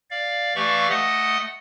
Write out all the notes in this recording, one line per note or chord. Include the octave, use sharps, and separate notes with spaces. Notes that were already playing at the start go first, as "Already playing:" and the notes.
D5 F5
E3 A3 G4 D5 F5 C#6
A3 D#5 F#5 D#6